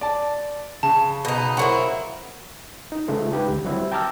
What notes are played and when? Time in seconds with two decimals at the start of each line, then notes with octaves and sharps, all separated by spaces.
0.01 D5 A5
0.83 C#3 A5
1.25 B2 D#4
1.57 F#3 A#3 E4 C5 F#5 C#6
2.92 D#4
3.08 C#3 G#3 A3 F4
3.30 G#3 D#4 G4 B4
3.49 D2
3.65 F#3 G3 C4 E4
3.92 G5 A5 A#5 D6 E6 F6